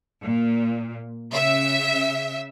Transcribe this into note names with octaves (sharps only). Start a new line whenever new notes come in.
A#2
C#3 E5